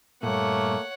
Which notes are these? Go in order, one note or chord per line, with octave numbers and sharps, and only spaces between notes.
G2 A#2 A3 A#3 C#5 F#5